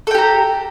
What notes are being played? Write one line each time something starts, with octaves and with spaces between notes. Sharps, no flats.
G4 A4 G5 A#5